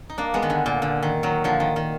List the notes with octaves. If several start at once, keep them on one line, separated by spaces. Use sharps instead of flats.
D#4
A#3 D4
G#3 B3
D#3
D3
A#2
D3
D#3
D#3 F#3
D3 F3
D#3
D#3